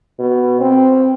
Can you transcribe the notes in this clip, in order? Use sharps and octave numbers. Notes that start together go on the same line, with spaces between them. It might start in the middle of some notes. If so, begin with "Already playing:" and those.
B2
C4